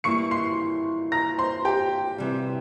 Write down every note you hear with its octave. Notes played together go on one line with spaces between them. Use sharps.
E3 G3 A#3 E4 C#6 C#7
C6 C7
A#5 A#6
C5 C6
G4 G5
C3 E3 G3